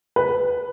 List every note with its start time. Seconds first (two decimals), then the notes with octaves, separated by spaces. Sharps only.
0.16 B4